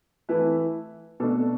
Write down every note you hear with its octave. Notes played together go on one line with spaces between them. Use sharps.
E3 A3 E4 B4
B2 A3 D4 A4 D5